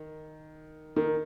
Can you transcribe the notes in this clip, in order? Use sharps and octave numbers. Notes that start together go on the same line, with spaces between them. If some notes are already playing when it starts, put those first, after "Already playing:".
Already playing: D#3
D#3